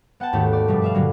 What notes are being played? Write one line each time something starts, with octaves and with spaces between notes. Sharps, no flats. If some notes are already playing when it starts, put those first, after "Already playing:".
B3 F#5 G5 A5
D#2 G#2 A3 F#4 G4
D5
G2 B2 F3 G3
B4 E5 F5
G2 A#2 D3 F#3